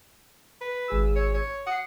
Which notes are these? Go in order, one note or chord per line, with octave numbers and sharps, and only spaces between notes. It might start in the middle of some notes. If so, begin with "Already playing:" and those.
B4
G#1 G#4 E6
C#5
C#5
F#5 D#6 C7